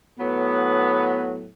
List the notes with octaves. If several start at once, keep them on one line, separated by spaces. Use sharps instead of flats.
A2 F#3 B3